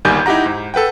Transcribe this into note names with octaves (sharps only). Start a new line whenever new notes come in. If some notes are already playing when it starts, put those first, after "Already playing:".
G1 D#2 D#3 G3 G#5 G6
D#4 E4 G4 F#5 A#5
G#2
A4 B4 F#5 G5